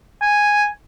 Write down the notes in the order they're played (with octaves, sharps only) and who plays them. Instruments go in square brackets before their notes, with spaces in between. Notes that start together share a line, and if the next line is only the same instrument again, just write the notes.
[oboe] G#5